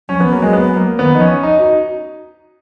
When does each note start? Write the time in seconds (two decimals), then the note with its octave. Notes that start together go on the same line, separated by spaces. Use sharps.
0.09 F#3 C#4
0.18 F3 B3
0.26 F#3
0.32 A#3
0.42 G#3
0.53 B3
0.76 A#3
0.99 D#3 B3
1.14 F3 D#4
1.21 C#4
1.43 D#4
1.58 D#4 F#4